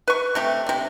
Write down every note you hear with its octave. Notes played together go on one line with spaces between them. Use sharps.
B4 C#6
C3 A3 G4
C3 D4